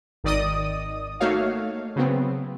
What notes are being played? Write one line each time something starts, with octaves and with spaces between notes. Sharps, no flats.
G#1 D#3 D5 D#5 D#6
A3 A#3 D#4 F#4 C#5 F5
C#3 F#3 B3 C4